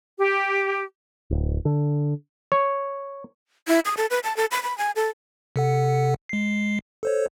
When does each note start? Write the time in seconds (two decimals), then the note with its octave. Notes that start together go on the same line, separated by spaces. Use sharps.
0.18 G4
1.31 D1
1.65 D3
2.52 C#5
3.68 E4
3.85 D#6
3.97 A4
4.10 B4
4.24 A5
4.37 A4
4.51 B5
4.63 B5
4.78 G#5
4.96 A4
5.56 C3 A4 F#5
6.29 G#3 C7
7.03 A4 C5 C#5